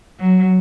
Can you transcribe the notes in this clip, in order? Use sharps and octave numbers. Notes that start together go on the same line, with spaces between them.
F#3